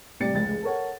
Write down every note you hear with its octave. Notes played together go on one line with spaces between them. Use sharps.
A2 C3 G3 D5 A6 C#7
F1 C#2 G#3 A6
A4 A#4 C#5 F#5